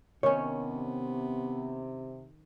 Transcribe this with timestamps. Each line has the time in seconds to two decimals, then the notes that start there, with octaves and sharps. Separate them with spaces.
0.23 C3 D#3 B3 C#4 C#5